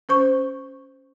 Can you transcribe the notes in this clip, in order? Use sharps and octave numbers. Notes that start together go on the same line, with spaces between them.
C#4 C5 C#6